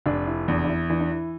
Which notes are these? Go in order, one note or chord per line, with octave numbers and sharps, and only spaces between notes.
F1 D4
E4
E2 D4
D4
E4
E3 D4
D4
E4